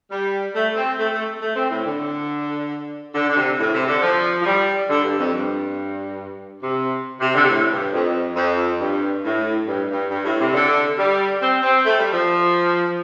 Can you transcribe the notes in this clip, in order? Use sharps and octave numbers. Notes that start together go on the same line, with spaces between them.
G3
A3
C4
A3
A3
A3
C4
A2
D3
D3
D3
C3
A2
C3
D3
F3
F3
G3
D3
G2
F2
G2
C3
C3
D3
C3
A2
G2
F2
F2
G2
A2
G2
G2
G2
A2
C3
D3
G3
C4
C4
A3
G3
F3